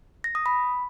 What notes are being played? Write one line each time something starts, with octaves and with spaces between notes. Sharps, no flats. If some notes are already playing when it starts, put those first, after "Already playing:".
A#6
D#6
B5